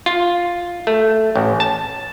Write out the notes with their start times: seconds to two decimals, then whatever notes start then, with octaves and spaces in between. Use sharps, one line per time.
0.06 F4
0.87 A3
1.35 A1
1.60 A5